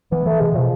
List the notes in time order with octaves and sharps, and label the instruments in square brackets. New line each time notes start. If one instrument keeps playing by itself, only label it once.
[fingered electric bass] E3 [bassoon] B3
[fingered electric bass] E3 [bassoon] A3
[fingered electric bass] C3 [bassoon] G#3
[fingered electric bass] B2 [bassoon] F3